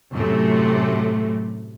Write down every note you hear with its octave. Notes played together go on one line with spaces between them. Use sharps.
F#2 A2 C3 A3